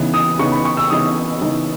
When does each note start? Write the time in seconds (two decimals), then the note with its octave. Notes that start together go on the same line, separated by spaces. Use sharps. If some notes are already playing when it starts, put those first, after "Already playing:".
Already playing: C#3 E3 B3 D#4
0.14 D#6
0.39 C#3 E3 B3 D#4 C#6
0.52 B5
0.65 C#6
0.77 E6
0.90 C#3 E3 B3 D#4 D#6
1.41 C#3 E3 B3 D#4